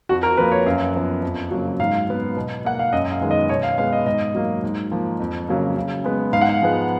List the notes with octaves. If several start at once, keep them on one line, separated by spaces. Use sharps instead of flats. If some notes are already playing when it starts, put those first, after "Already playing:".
F2 F#4
A#4
F3 A#3 B4
C#5
F#2 F5
F3 B3
F2
C#3 F#3 A#3
G#2 F5
F#3 B3
B2
A#3 F#5
F5
F#2 D#5
F5
D#3 G#3 B3
D#5
B2 C#5
F5
G#3 B3 F5
D#5
G#2 D#5
F#3 A#3
G#2
F3 A#3
F2
C#3 F#3 A#3
C#3
G#3 B3
G#2 F5
F#5
F5
F3 G#3 B3